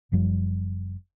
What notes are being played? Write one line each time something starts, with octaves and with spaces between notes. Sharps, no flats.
F#1 F#2 F3 G3